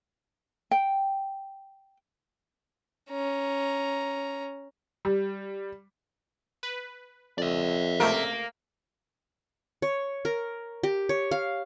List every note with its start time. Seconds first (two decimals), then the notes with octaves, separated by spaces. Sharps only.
0.71 G5
3.10 C#4 A#5
5.05 G3
6.63 B4
7.38 F2 D5 E5
8.00 C#2 C3 A3 A#3 A#4
9.82 C#5
10.25 A#4
10.83 G4
11.09 C#5
11.31 F5